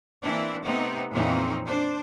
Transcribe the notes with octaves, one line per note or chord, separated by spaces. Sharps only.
E3 A#3 C4 D4 E4
C3 A3 B3 C4 D#4
F2 A#2 E3 C4 C#4 D#4
D4 C5